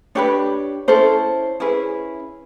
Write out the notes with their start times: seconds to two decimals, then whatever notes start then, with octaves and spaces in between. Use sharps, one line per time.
0.15 D4 G4 B4 C#5
0.88 C#4 E4 A4 C5
1.60 C#4 E4 G#4 B4